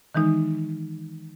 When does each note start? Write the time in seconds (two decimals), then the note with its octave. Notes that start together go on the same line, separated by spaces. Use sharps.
0.15 D#3 E3 G#3 D#4